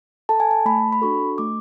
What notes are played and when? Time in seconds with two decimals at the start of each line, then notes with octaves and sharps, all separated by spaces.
0.29 A4 A5
0.40 G#5
0.51 A5
0.65 A3 B5
0.92 B5
1.02 D4 F#4 A4 C#6
1.38 A3 D6